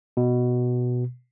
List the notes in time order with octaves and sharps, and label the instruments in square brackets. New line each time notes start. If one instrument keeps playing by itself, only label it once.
[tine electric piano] B2